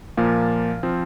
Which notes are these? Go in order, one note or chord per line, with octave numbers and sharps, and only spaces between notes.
A#2 F3 A#3 F5
F3 C4